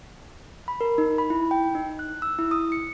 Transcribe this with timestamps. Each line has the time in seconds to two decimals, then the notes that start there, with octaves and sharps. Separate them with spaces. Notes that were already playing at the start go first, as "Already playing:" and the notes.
0.68 B5
0.81 A#4
0.98 D#4
1.18 B5
1.30 E4
1.51 G5
1.75 D#4
1.99 F#6
2.22 E6
2.39 E4
2.51 D#6
2.72 C#7